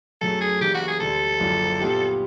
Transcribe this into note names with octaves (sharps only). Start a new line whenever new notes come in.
F#2 C#3 F#3 A3 A4
G#4
C#3 E3 G3 A#3 G4
F#4
G#4
D2 D3 G3 A4
F#1 F#2 D3 F3 A#3
A#2 G3 B3 E4 G4